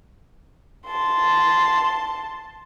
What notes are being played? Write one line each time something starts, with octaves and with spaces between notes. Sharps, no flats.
A5 C6